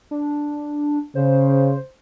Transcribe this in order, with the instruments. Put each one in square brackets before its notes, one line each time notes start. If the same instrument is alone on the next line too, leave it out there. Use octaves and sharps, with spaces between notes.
[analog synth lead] D4
[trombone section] C#3 [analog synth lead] C5